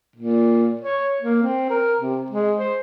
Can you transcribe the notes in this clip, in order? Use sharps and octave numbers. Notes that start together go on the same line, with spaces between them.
A#2
C#5
A#3
C4
A#4
C3
G#3
C5